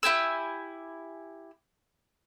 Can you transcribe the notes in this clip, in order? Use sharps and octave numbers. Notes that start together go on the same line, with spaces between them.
E4 G4 G#5 E6